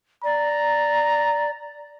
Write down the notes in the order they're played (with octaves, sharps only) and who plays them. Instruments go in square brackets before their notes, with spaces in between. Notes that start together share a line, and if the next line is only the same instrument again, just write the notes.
[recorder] D5 [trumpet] A#5